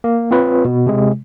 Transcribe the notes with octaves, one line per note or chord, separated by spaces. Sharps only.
A#3
C4 F4 B4 C#5
B2
C3 G#3